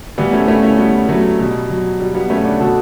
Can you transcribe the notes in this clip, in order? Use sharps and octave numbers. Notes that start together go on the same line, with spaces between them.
A2 E3 G3 B3
A3 C#4
A3 C#4
A3 C#4
G3 B3
F#3 A3
B2 G3
F#3
G3
G3 B3
A3 C#4
B3 D4
B2 F#4 A4